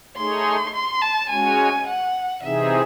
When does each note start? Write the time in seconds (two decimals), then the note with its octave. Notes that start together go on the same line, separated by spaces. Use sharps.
0.16 A3 D#4 G#4 C#5 C6
0.74 C6
1.02 A5
1.30 G#3 C#4 F#4 C#5 G#5
1.87 F#5
2.43 C3 E3 C4 D#4 G#4 E5